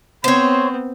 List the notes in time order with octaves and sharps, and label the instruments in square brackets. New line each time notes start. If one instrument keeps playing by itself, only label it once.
[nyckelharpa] B3 C4 [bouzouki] C5 C#5 [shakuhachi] C6